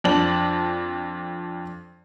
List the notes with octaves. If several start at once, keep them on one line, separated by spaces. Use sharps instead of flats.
F2 D4 F#7